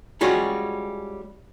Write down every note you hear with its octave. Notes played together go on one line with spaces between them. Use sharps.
G3 G#3 C#4 F4 F#4